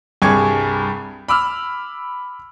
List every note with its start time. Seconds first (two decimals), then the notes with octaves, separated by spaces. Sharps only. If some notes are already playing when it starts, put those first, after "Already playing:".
0.22 C2 G2 G#4 C#6 D6 G#6
1.28 B5 D6 E6 F6